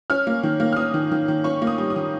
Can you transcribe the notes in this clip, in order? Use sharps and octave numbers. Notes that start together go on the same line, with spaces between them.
C#4 F6
A#3
D#3
A#3
F6
C#4 D#6
D#3
D#3
D#3
C#4 C#6
A#3
D#6
G3
D#6
D#3